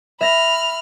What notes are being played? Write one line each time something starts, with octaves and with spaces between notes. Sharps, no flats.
E5 B5 F6 A#6